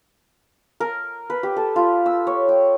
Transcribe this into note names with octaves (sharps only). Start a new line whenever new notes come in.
A#4
B4
G4
A4
F4
E6
C#5
G5